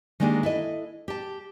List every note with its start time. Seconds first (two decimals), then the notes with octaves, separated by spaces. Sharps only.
0.20 D#3 G#3 A#3 D4 F#4 G4
0.43 E4 A4 D#5
1.08 G4 A5